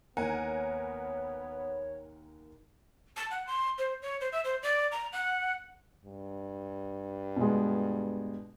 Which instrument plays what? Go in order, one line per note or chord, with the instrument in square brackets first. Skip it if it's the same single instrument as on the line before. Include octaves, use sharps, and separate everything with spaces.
[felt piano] D#2 D#3 [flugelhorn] B3 [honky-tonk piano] A#4 F#5 G#5 [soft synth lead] C#5
[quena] A5
F#5
C6
C5
C#5
C5
E5
C5
D5
A#5
F#5
[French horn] G2
[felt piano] B2 G#3